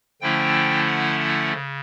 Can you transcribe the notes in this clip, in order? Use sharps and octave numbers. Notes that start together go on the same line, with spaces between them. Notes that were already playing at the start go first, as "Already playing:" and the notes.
D3 F3 A3 C#4 E4 G5
F#5
F#5
C#3